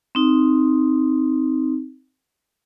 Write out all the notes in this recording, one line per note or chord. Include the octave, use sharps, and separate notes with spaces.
C4 D#4